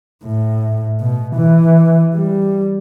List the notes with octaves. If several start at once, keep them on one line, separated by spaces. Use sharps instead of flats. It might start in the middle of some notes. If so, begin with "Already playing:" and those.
A2
B2
E3
G3